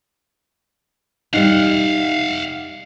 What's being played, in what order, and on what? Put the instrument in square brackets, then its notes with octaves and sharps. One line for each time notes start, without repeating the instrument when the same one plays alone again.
[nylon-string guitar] G3 D#4 [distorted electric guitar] F5 F#5